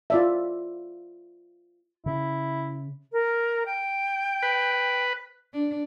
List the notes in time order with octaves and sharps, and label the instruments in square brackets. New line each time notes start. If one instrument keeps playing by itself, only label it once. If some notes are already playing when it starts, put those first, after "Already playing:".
[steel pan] F4 D5 E5
[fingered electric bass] C#3 [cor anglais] E4
[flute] A#4
G5
[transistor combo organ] B4
[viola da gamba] D4